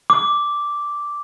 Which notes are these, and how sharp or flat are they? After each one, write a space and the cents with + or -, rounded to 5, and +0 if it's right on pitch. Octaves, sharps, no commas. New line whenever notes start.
D6 -5